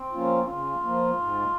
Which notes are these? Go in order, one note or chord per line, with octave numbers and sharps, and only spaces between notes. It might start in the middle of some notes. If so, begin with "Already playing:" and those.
Already playing: C4
F3 A#3 C#4 F4
C#3 F4
F3 A#3
G#2